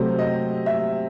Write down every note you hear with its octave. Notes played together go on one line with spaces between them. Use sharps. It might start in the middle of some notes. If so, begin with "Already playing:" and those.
Already playing: C3 F#3 A3 C5
D#5
E5